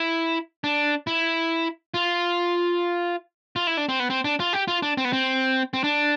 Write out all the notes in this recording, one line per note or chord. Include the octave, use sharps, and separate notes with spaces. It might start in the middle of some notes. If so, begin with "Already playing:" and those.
Already playing: E4
D4
E4
F4
F4
E4
D4
C4
B3
C4
D4
F4
G4
F4
D4
C4
B3
C4
C4
D4